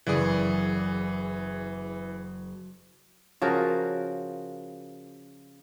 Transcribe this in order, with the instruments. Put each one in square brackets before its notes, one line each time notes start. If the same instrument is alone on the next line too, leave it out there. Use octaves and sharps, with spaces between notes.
[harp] F#1 D5 [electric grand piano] E3 G#4
[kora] C#3 F3 F#4 A#4